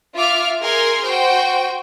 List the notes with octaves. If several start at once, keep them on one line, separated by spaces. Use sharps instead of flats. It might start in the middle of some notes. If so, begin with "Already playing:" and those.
F4 E5 D6 F6
G#4 A#4 G#5 C6 F6
F#4 C5 G5